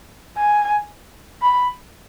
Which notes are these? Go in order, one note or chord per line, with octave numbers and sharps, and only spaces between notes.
G#5
B5